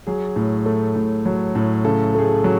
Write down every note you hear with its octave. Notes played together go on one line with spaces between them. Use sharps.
F#3 G#4
A2
A3
A2
F#3
A2
C#3 A4
A3 G#4
A4
F#3